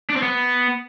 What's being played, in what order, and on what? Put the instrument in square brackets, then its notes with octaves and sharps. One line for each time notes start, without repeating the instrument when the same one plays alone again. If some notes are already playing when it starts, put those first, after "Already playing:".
[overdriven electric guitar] D4
C4
B3